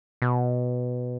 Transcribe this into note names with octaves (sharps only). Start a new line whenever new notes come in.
B2